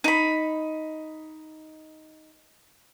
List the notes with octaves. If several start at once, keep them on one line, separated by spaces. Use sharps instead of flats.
D#4 B5